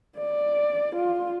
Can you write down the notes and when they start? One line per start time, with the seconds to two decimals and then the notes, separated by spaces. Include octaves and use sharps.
0.19 D5
0.96 F4